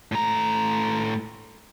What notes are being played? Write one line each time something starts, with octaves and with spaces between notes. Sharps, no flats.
A2 A#5